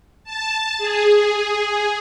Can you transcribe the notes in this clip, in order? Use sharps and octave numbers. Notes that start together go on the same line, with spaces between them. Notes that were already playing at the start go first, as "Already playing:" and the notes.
A5
G#4